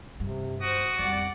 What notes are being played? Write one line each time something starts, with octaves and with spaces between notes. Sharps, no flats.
G2 C3
F#4 C5 D#6
F2 G3 D5 F#5